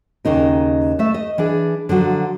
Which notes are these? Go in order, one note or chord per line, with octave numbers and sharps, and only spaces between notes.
D#2 C#3 D#4 A#4
A3 E5
D#5
E3 D4 G#4
D3 F3 F#3 F#4